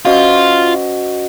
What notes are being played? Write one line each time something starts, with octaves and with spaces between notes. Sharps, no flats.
C#4 F4 F#4 C5 D#5 F#5